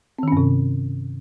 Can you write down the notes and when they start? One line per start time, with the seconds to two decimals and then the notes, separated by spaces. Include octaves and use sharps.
0.19 C4
0.23 D#3
0.28 C#4
0.32 G2
0.37 C3